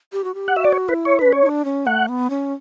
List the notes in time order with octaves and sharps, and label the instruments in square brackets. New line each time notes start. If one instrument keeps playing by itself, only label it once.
[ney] G4
F#4
G4
[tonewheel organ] F#5
[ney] F#4 [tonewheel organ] E5
[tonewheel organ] D5
C#5
[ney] E4 [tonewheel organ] B4
[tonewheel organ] C#5
[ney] D4 [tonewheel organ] B4
[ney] C#4
[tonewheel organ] C#5
[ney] E4
D4
C#4
[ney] A3 [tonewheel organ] F#5
[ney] B3
C#4